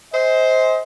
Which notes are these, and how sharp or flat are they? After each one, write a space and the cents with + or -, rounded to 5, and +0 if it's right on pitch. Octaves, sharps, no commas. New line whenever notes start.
C5 +0 D#5 +35 G#5 -15